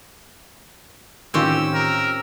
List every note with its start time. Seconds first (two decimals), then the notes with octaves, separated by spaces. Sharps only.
1.34 A2 D#3 C4 C#4 F4 G4 E6
1.74 A#4